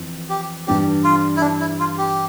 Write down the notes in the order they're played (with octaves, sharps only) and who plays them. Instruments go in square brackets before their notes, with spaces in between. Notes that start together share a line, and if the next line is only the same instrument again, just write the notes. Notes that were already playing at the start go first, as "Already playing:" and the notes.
Already playing: [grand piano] F2 E3
[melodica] G4
[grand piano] G2 E3 G3 D4 [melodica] G4
[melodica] F4
E4
D4
E4
F4
G4